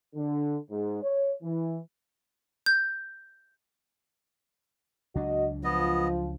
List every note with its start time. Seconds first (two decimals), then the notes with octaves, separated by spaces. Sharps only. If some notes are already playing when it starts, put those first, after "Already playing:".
0.15 D3
0.71 G#2
1.03 C#5
1.43 E3
2.66 G6
5.15 C#2 F#3 D4 F#4 D#5
5.64 F3 B3 D#5